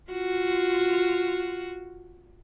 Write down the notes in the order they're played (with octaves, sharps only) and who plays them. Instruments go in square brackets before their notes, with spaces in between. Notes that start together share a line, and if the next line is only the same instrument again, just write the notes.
[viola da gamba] F4 F#4